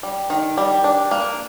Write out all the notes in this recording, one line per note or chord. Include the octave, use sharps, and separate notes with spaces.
G3
D#3
G3
D4
A#3